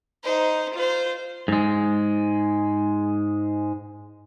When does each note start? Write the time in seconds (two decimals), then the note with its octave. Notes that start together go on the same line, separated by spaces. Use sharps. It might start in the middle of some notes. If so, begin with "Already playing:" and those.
0.23 D#4 C5
0.74 F4 C5
1.48 G#2 G#3